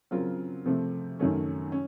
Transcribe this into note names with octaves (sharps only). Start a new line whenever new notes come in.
C#3 F#3 C4 F4 A#4
C3 F3 A3 C4
F#2 D#3 F#3 A3 C#4
C#4